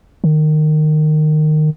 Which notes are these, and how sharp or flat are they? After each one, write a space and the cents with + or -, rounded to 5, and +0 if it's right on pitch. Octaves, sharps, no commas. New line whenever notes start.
D#3 -20